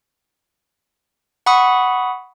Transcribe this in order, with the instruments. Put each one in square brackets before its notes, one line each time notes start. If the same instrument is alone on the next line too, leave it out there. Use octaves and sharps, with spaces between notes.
[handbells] F#5 B5 C#6 D#6